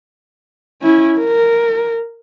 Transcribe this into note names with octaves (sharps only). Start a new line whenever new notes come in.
C#4 E4
A#4